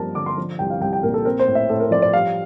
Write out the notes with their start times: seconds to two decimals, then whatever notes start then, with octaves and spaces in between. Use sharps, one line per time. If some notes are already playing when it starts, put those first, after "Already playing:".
Already playing: G2 F3 A#3 A#4 A5
0.15 D3 D6
0.26 C6
0.38 F3
0.59 C2 G5
0.70 F5
0.81 C2 G5
0.93 G5
1.03 A#2 A#4
1.14 A4
1.25 C4 A#4
1.39 C5
1.48 A2
1.55 E5
1.69 A2 A4
1.80 A#4
1.91 F3 D5
2.02 D5
2.13 G3 F5